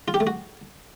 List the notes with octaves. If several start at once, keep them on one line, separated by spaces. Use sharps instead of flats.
F4
G4
A3
F#4